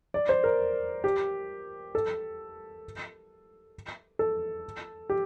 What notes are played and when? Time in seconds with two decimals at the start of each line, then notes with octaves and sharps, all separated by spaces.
0.14 D5
0.29 C5
0.44 A#4
1.04 G4
1.95 A4
4.19 A4
5.10 G4